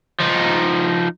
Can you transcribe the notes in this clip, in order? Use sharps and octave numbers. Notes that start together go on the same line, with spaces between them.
F3 D#4